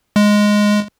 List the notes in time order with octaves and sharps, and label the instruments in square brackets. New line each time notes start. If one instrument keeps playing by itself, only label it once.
[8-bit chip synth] G#3